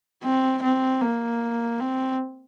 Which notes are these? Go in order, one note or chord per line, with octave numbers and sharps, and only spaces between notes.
C4
C4
A#3
C4